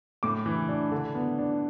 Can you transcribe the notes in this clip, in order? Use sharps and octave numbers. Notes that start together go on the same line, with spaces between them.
A2 D6
E3
D4
D3
B3
D4